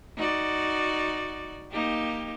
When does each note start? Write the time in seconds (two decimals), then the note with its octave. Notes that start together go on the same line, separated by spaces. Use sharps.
0.16 D#4 F#4 D5
1.72 A#3 D#4 G4